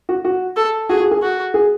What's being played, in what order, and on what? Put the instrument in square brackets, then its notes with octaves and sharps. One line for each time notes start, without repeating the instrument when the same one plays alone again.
[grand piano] F#4
F#4
[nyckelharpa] A4
[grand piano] F#4 [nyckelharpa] G#4
[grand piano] F#4
G#4
[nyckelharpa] F#4
[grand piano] G#4